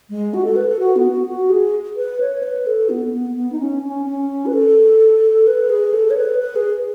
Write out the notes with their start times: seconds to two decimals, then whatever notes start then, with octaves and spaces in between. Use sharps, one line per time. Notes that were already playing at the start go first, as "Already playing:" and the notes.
0.10 G#3
0.34 F#4
0.44 A4
0.56 B4
0.69 A4
0.79 F#4
0.96 B3
1.11 F#4
1.27 F#4
1.50 G#4
1.96 B4
2.20 C#5
2.43 B4
2.66 A4
2.89 B3
3.13 B3
3.36 B3
3.52 D#4
3.60 C#4
3.83 C#4
4.06 C#4
4.46 B4
4.53 A4
5.47 B4
5.69 G#4
5.93 A4
6.10 C#5
6.17 B4
6.39 B4
6.56 G#4